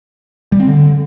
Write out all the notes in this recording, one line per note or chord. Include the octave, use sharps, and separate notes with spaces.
G3
C4
D3